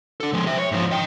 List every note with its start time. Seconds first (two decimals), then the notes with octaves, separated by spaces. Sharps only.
0.20 D4 A4
0.33 F3 G#3
0.47 C5 E5
0.59 C#5
0.72 G#2 F3
0.91 D#5 G5